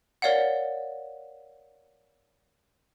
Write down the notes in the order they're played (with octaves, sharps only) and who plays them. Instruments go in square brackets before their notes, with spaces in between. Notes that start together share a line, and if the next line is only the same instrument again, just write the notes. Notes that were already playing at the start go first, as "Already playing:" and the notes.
[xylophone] A#4 C#5 D5 F5 F#5